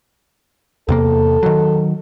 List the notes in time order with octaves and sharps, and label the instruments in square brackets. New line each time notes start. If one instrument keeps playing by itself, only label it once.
[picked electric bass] E2 C3 A#3 [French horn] A4
[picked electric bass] D#3 F#3